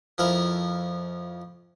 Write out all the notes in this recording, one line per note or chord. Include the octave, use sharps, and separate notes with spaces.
F2 F3 E4 A#4